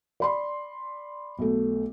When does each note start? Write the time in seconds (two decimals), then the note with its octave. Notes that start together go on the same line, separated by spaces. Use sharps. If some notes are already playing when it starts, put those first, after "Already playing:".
0.20 D5 B5 C6
1.39 B1 A3